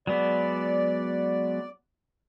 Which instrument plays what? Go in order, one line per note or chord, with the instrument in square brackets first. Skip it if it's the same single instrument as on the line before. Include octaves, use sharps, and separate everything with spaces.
[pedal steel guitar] F#3 G#3 B3 [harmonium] D5